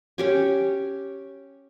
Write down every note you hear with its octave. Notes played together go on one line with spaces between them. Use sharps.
C#4 G4 G#5